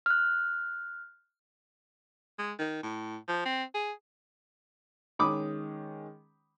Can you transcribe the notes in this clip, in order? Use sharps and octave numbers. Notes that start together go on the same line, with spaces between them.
F6 F#6
G#3
D#3
A2
F3
C4
G#4
D#3 G#3 C#4 B5 D6 D#6